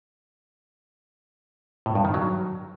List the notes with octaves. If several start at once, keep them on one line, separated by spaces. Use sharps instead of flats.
A2
G2
D#3
F#3